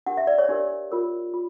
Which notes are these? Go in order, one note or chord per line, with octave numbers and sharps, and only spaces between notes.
D4 G4 A#4 F#5
E5
D5
C#5
D4 G4 A#4 D5
F4 A#4 C#5
F4